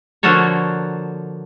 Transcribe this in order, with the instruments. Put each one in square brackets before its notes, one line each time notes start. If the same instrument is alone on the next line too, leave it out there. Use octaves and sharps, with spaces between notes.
[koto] D3 F3 A#3 F#4 A4 C#5